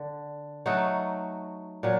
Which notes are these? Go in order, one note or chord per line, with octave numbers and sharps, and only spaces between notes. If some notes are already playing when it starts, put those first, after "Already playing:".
Already playing: D3
F#3 A3 D#4 F#4
A#2 F#3